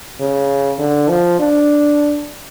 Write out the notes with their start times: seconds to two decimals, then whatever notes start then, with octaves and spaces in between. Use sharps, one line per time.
0.20 C#3
0.79 D3
1.09 F3
1.40 D4